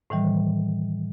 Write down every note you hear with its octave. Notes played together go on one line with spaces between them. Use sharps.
A2 D#3 E3 G3